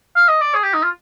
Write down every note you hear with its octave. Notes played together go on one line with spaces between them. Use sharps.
F5
D#5
D5
G#4
G4
D#4
F4